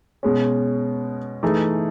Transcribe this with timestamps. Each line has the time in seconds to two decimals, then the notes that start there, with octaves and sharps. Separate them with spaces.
0.23 B2 G#3 C#4
1.43 E3 A3 D#4 G#4